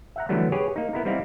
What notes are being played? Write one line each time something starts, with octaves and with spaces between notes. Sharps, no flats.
E5 F#5 A#5
D3 E3 F#3 G3 A3 B3
G4 G#4 B4 C#5 G#5
A#3 D#4
B3 E4 A#4
G3 C4 D#4 E4 D5 F5